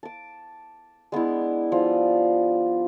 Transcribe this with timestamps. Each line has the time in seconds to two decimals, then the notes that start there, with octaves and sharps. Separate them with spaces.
0.03 A5 D6
1.12 G#3 B3 D4 E4
1.72 F3 G3